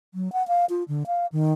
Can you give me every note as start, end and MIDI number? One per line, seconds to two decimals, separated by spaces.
0.14 0.32 54
0.33 0.46 78
0.48 0.65 77
0.70 0.84 65
0.88 1.03 50
1.07 1.26 77
1.32 1.53 51